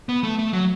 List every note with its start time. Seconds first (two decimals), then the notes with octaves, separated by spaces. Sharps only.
0.09 B3
0.23 A3
0.39 A3
0.53 F#3